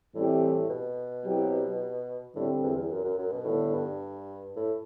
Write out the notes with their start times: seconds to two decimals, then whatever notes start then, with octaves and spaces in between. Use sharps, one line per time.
0.14 A2 E3 G3 C4 G4
0.69 B2
1.25 F#3 C4 E4 G4
2.36 A2 D3 G3 C4 G4
2.63 E2
2.77 E2
2.91 F#2
3.04 F#2
3.18 F#2
3.32 B2
3.46 A2 D3 G3 B3 D4
3.74 G2
4.56 A2